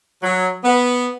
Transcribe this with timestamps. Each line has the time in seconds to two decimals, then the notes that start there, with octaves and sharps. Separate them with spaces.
0.22 F#3
0.64 B3